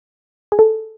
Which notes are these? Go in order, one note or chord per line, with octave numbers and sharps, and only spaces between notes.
G#4
A4